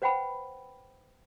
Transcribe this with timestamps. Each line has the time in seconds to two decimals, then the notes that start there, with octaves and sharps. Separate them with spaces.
0.02 B4 C5 F#5 G5 B5